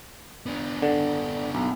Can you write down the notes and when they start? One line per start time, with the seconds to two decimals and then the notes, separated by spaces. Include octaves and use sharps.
0.46 B3 D4
0.82 D3
1.55 B1